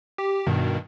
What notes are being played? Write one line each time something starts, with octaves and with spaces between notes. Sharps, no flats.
G4
G2 B2 D#3